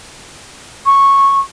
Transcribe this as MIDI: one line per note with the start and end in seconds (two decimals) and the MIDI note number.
0.86 1.39 85